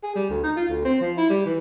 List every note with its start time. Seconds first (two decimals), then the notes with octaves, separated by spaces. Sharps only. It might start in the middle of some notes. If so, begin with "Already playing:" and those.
0.03 G#4
0.16 G3
0.29 D2
0.43 D#4
0.56 F4
0.68 D2
0.85 C4
1.01 F3
1.17 E4
1.30 G3
1.46 E3